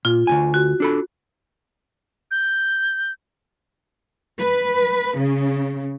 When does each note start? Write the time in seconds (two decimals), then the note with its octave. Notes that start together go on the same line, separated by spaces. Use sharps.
0.05 A#2 F4
0.27 D2 G#2 G#5
0.54 F#4
0.80 D4 A4 B5
2.31 G6
4.40 B4
5.18 C#3